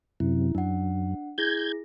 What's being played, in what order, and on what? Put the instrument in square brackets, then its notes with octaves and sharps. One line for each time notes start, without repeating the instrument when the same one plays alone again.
[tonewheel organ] F#2 C3 [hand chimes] E4
[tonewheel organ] F#2 [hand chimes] D4 F#5
[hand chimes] E4 G#4 A#6 [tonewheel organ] G6 G#6